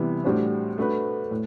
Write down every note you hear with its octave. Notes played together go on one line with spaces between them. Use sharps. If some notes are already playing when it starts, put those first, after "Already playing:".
Already playing: C3 E3 G3 B3 E4
A2 G3 D4 F#4 C5
A3 D4 F#4 B4
A2